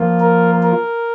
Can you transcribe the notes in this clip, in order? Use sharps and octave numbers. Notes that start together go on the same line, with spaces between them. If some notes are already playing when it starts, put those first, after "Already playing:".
Already playing: F3 A#3 F4
A#4
A#4